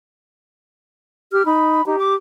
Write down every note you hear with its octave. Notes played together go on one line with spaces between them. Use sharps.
G4 F6
D#4 B5
D#4 G4
D6